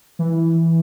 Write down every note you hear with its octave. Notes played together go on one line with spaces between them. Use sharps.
E3